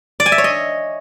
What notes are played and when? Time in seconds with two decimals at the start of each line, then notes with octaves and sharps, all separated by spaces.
0.20 D5
0.26 G#5
0.32 E5
0.38 C#5
0.44 D#5